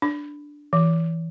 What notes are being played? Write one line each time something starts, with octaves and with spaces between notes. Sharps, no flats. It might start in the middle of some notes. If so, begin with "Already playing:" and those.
D4
E3